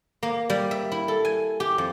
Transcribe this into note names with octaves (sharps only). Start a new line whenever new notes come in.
A#3
G3
E5
E4
A4
G#5
G4
F2